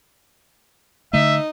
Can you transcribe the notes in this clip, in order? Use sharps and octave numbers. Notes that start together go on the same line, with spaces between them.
D3 A3 D#4 E5